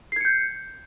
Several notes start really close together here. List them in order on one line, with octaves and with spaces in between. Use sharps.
C7 G#6 C#7 G6